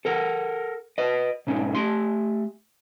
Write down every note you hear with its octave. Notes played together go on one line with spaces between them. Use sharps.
A4 A#4 F#5
B4 D#5
B1 G#2 C#4
A3 G4 C6